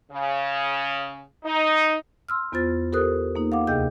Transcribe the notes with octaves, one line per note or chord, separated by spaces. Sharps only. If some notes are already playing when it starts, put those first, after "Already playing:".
C#3
D#4
C6 E6 F6
E2 B3 F4 C5 A6
G4 A4 A#4 C5 D#6 F#6
A#3 D#4
F5 F#5 D6
D2 C3 G#4 D#5 G5 G6